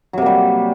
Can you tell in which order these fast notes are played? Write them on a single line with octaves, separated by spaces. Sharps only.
F#3 C3 A#3 G3